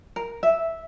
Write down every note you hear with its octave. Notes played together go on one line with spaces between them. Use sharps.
A#4
E5